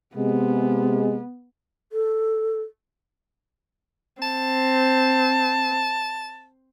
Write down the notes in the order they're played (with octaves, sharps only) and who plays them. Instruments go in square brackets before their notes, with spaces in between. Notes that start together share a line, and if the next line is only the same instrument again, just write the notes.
[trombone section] C3 G#3 [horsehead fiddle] B3
[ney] A4
[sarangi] C4 [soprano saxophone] A5